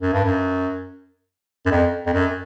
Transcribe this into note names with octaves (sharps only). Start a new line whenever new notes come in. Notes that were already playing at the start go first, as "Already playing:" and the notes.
F#2
G2
F#2
F#2
F2
F2
F#2